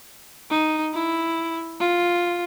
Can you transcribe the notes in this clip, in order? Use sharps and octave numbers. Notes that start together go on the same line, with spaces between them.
D#4
E4
F4